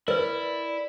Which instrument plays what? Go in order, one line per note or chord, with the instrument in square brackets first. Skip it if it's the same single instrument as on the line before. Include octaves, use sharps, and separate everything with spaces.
[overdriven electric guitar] E4 [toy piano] A#4 B4 [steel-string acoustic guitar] D5